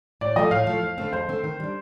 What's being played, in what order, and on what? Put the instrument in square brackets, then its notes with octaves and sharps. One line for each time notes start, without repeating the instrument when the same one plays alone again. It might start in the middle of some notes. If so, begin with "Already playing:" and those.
[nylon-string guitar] A2 [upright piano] D5
[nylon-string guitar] F3 A3 [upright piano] D#5
[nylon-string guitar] A2 [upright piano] F5
[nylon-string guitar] F3 A3
F2
D3 A3 C4
[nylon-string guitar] F2 [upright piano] C5
[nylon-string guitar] D3 A3 C4
D#3
G3 D4